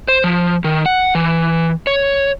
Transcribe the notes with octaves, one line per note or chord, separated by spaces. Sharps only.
C5
F3
D#3
F#5
E3
C#5